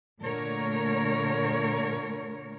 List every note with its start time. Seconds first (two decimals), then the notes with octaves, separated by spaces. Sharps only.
0.21 A#2 D3 A3 A#4 C#5